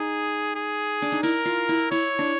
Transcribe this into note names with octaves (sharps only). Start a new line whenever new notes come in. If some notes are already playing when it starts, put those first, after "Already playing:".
Already playing: D#4 G#4
G#4
D4
D#4
E4 A#4
F4
E4
E4 C#5
D4